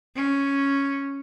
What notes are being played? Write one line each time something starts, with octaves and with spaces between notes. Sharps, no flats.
C#4